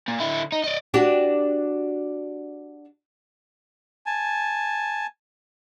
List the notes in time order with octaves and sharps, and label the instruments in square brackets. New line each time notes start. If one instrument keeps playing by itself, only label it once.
[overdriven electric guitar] A#2
D3 E4
D#4
D5 D#5
[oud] D4 F#4 G4
[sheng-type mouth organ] G#5 A5